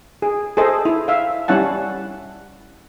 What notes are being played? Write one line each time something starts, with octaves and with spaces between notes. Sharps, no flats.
G#4
G#4 A4 C5 D#5
E4
E5 F5
G3 C#4 E4 F#5 A5